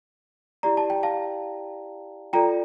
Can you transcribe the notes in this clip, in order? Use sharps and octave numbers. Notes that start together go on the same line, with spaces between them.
E4 G4 D5 A#5
A5
G5
F5 A5
F4 A4 D5 G5 A#5